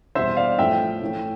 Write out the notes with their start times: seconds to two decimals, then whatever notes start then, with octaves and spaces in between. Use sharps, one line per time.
0.15 E2 B2 G3 C5 E5
0.37 D5 F5
0.58 A2 F3 A3 E5 G5
1.01 A2 E3 A3